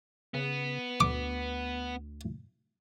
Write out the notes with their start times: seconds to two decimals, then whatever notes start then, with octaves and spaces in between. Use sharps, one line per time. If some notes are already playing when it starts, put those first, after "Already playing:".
0.34 C#3 B3
1.00 D2 D6